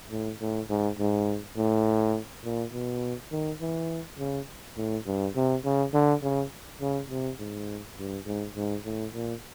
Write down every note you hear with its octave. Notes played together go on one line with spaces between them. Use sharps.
A2
A2
G#2
G#2
A2
A#2
B2
D#3
E3
C#3
A2
G2
C3
C#3
D3
C#3
C#3
C3
G#2
G2
G#2
G#2
A2
A#2